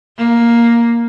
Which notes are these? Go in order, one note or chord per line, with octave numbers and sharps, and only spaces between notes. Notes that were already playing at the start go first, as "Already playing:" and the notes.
A#3